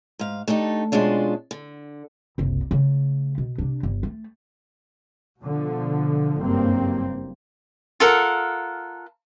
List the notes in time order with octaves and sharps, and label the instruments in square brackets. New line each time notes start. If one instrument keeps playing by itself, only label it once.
[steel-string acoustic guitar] G#2 F5
A3 D4 D#4 G4
B2 G#3 C#4 D4 F4
D3
[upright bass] F#1 C2
C#3 A3
B2
C3 D4
G1
A3
[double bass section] B2 D3 F3
F#1 G2 A#3 C4
[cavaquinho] F4 A4 A#4 F#5